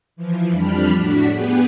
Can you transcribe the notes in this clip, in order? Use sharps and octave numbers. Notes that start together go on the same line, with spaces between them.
E3 F3
F2 G3 D4 B5 F6
A2 D4 F#4 B6
B3 G4 G#4 B4